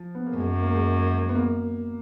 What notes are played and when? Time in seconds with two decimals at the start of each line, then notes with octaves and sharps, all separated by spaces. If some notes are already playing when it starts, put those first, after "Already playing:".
Already playing: F3
0.15 B3
0.26 A#3
0.37 F#2 G#3
0.62 A#3
0.74 G#3
1.29 B3
1.35 A#3